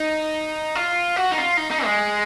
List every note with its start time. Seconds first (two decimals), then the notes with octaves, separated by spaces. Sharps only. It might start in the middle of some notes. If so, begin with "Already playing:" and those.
Already playing: D#4
0.75 F4
1.16 F#4
1.32 D#4
1.37 F4
1.57 D#4
1.71 D#4
1.84 G#3